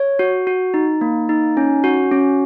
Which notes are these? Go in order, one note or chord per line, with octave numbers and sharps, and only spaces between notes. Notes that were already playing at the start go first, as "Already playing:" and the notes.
Already playing: C#5
F#4
F#4
D#4
A#3
D#4
C#4
F#4
C#4